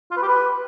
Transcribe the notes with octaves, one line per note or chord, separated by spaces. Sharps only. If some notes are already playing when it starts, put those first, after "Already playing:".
F4
B4
G4
B4